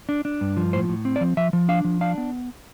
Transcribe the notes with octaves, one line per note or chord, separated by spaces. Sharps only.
D4
D4
G2
F3
A2 C5
A2
C4
D5
F3
F3 E5
F3
D4 F5
F3
D4 F5
B3